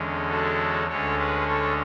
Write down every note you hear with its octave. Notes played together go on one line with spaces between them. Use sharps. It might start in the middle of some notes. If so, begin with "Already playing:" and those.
Already playing: E2 D3 G#3 C#4
F#4 A4
D2 D3 G#3 C#4 A4 C#5
G#4 B4
A4 C#5